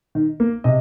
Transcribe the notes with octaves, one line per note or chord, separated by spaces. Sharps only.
D#3
A#3
C3 D#5